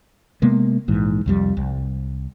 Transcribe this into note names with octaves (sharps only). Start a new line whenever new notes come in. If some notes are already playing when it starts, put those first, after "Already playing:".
C3 G#3 A#3 B3
A#1 G#2 E3
C2 F2 G3
C2